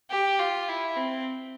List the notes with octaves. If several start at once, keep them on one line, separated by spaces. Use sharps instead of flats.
G4
F4
E4
C4